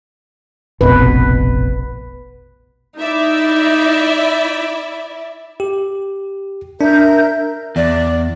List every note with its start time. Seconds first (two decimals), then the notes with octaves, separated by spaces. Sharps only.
0.81 F1 A#1 B2 B4
3.00 D#4 E4 D5 E5
5.60 G4
6.81 D4 A#4 E5 G6
7.76 E2 D5